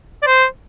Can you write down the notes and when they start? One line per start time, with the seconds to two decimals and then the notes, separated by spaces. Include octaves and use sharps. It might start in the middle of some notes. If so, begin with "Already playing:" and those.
0.22 D5
0.27 C5